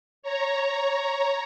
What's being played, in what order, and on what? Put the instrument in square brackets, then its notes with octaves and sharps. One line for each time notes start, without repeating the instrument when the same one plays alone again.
[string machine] C#5 A#5